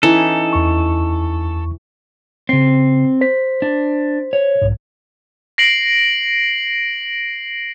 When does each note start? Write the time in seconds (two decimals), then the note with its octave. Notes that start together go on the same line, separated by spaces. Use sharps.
0.03 E3 C#4 D#4 A4
0.53 E2 C#6
2.49 C#3 C4 C7
3.21 C5 B6
3.62 D4
4.33 C#5
4.62 B1 G#2
5.58 A#6 C7 D7 F#7